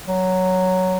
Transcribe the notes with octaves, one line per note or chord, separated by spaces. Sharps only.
F#3